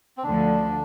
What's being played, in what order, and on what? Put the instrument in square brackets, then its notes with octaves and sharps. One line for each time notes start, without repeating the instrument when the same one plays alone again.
[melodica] C4
[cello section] D2 D3 F3 [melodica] D4